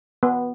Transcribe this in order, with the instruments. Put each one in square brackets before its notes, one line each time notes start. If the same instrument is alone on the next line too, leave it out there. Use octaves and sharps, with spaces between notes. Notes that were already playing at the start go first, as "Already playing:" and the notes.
[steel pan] B3